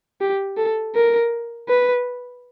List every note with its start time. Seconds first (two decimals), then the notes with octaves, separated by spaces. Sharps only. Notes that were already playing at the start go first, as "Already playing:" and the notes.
0.21 G4
0.57 A4
0.95 A#4
1.69 B4